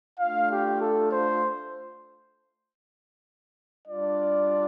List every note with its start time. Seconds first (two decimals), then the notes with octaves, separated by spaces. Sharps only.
0.19 A3 D4 F4 F5
0.50 G4
0.81 A4
1.11 C5
3.87 G3 D4 F4 D5